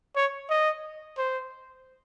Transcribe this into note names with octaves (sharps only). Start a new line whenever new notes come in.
C#5
D#5
C5